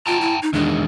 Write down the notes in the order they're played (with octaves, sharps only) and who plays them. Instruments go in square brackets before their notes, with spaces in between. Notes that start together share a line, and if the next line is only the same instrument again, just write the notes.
[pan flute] F4 [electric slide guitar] G5 A5 A#5
[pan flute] E4
D#4
[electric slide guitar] E2 D#3 G#3 [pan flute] D4